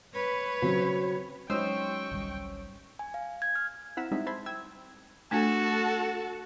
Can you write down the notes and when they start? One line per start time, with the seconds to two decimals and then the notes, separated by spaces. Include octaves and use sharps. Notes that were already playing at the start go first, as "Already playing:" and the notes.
0.14 B4 C#5
0.62 C#3 F#3 C4
1.49 F#3 G#3 C#4 D#4 C5 G5 C#6 E6
2.11 G#1 C#2 G3
2.99 G#5
3.14 F5
3.42 G#6
3.56 F6
3.97 C4 E4 F#5 A#5 B6 E7
4.11 G3 G#3 C4 D#4 E5
4.27 C5 A5 B5 C6 E6 G#6
4.46 G5 E6 G#6
5.31 A3 D4 F#4 A4 A5